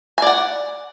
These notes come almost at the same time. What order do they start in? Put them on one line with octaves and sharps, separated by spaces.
G#5 D5 F#5